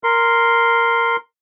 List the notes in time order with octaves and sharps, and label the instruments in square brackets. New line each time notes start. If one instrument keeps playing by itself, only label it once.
[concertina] A#4 C6